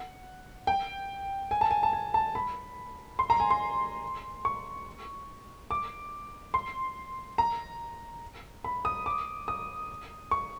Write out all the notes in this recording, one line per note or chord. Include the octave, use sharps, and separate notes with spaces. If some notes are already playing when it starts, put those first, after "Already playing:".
Already playing: F#5
G5
G#5
A5
G#5
A5
G#5
A5
B5
C6
A#5
G#5
C6
C#6
D6
C6
A#5
B5
D#6
D6
D#6
C#6